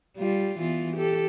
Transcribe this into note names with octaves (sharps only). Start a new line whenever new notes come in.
G3 F4
E3 B3 F4
G4 A4